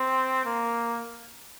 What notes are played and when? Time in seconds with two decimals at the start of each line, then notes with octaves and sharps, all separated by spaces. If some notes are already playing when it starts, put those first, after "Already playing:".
Already playing: C4
0.46 A#3